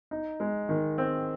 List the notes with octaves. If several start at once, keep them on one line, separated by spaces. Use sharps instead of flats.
D#4
G#3
D#3
C4